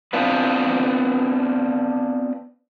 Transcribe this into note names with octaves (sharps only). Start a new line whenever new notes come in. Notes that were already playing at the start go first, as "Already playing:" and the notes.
B3 C4 D4 F4 B4